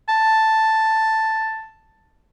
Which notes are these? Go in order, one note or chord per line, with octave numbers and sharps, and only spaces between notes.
A5